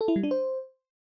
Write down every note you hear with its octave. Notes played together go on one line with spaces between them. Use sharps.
A4
E4
G3
D4
C5